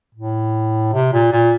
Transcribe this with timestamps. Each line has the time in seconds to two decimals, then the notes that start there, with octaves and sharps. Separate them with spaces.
0.15 A2
0.93 C3
1.13 A#2
1.32 A#2